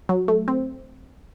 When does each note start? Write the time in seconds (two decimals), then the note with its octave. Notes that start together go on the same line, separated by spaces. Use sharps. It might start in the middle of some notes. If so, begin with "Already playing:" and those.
0.09 F#3
0.28 A3
0.48 C4